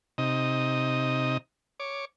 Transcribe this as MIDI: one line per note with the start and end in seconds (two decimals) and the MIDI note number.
0.18 1.37 48
0.18 1.37 63
0.18 1.37 75
1.80 2.05 73
1.80 2.05 86